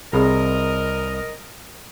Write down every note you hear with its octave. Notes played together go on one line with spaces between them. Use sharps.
C2 C4 G#4 A#4 D#5 B5